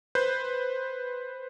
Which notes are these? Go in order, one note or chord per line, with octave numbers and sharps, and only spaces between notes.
B4 C5 G6